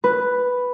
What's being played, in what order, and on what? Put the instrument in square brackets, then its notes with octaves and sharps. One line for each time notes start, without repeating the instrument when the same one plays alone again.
[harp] B4